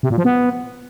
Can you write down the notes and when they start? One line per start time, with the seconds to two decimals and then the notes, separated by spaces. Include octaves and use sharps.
0.03 C3
0.10 A#2
0.18 F3
0.25 B3